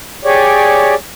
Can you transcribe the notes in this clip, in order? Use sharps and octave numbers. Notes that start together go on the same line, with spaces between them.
G4 G#4 C#5 D5